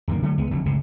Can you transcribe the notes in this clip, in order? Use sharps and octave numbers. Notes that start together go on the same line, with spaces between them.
D1 F#2 D#3 A#3
D3 F#3 A3
C#2 G#3 B3
F1 F2 D3 F#3
F#1 C#2 A2 C3